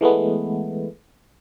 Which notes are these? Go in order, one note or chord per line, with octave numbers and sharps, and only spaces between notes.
E3 G#3 A3 B3